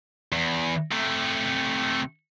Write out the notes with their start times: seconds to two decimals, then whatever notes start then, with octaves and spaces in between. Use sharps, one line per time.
0.32 E2
0.92 C3 A3